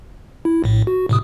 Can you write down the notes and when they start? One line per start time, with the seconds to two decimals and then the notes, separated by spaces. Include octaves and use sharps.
0.45 E4
0.64 A#1 A2
0.87 F#4
1.09 A2 C3 D#6